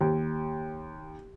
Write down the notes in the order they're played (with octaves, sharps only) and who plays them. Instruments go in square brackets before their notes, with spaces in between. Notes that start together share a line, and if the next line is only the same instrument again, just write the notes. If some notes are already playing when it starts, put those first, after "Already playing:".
[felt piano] D#2